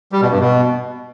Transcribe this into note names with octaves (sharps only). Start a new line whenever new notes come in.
G3
B2
G2
B2